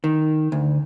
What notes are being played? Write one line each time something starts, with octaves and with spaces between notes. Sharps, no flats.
D#3
D2